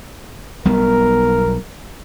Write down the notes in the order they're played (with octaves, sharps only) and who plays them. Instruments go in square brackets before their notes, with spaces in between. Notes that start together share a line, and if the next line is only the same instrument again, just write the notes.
[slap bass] B1 G3 B3 [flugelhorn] A#4